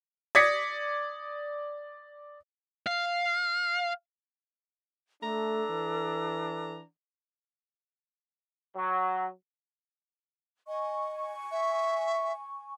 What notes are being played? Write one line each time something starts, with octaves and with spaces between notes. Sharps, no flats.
D5 D#6 G#6 A#6 B6 C#7
F5
A3 D4 A4 A#5
E3
F#3
D#5 G#5 C#6
E5